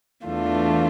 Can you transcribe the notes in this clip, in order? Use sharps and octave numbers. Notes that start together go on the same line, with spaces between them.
E2 E3 A3 D4 F4